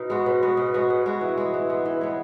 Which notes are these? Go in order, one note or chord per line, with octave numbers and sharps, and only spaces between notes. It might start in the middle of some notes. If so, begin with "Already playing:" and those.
Already playing: B2 D#4
G#3 B3 F#4
B2
G#3 B3 F#4
B2
G#3 B3 F#4
B2
G#3 B3 F#4
E3
G#3 B3
E3
G#3 B3
E3
G#3 B3